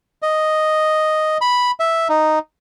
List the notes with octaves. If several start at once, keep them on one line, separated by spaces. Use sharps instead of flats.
D#5
B5
E5
D#4